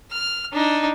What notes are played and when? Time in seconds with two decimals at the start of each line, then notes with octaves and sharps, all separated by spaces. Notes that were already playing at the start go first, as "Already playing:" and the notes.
0.11 F6
0.53 D4 D#4